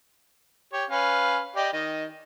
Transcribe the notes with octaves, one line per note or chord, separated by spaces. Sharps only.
G4 C#5
C#4 B4 F5
G4 D5 D#5
D#3 D#5